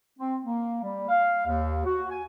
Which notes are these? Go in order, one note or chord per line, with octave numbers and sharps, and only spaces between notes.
C4
A#3
G3
F5
D#2
F#4
G#5